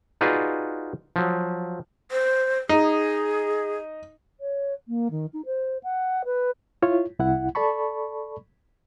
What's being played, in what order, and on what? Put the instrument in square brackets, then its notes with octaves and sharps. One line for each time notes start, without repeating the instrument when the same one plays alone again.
[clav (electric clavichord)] D#4 F4 F#4 G#4 B4 D5
F3 F#3
[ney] C5
[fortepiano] D#4 [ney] G#4
[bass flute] C#5
A#3
D#3
D#4
C5
F#5
B4
[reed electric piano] E4 F4 C#5
C2 E4 F#5
A4 D5 A5 B5 C#6